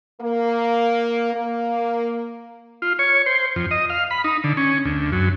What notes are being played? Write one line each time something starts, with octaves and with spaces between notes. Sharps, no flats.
A#3
A#3
F4
C#5
C5
F2
D#5
F5
B5
D#4
D3
C#4
D2
F#2